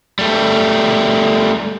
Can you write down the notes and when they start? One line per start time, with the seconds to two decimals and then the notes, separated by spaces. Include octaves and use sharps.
0.19 G3 A3